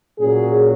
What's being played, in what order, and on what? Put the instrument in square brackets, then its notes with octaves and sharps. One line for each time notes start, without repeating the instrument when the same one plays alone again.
[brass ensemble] A#2 F#3 C#4 G#4